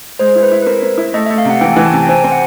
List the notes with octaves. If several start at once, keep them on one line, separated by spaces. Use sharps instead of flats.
G#3 C5
E4
B4
E4
B4
C4 A#4
C4
E4
A3 D#5
E5
A3
F5
C3 F#5
E3 G5
G#5
E3
A5
C3 G#5
G5
C4 G#5
C4
F#5